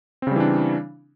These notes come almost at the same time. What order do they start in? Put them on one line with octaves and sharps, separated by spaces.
C4 C#3 G3 E3 D4